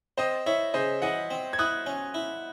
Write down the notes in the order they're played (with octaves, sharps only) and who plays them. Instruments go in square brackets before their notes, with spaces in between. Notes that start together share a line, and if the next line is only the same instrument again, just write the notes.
[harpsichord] C4 [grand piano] C5 D#5
[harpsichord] E4 [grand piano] C#5 E5
[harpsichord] C#3 [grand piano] C5 D#5
[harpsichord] E3 [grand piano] D#5 F#5
[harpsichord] C4
[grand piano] G#6
[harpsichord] E4 [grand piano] D#6 F#6
[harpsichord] C#4
E4